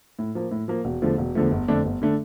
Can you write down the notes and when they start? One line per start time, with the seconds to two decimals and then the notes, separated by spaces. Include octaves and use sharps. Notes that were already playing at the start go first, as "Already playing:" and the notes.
0.19 A2
0.35 F3 A#3
0.51 A2
0.68 F3 A#3
0.85 E1
1.02 E2 D3 F3 A3
1.18 E1
1.35 E2 D3 F3 A3
1.51 G1
1.68 F2 D3 A3 D4
1.85 G1
2.02 D3 A3 D4